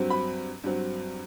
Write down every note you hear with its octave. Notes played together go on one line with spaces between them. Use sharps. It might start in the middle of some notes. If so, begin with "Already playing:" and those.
Already playing: G2 F#3 C4
B5
G2 F#3 C4